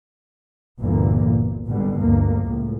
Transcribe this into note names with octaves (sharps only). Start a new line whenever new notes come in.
G1 D2 G2 A#2 E3 A#3
A#2
G#1 G#2 B2 D3 G3
D2 G2 F3 A#3
C#2 A2